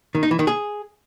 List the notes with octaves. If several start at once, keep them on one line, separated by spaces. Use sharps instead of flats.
D#3
D#4
E3
D#3
G#4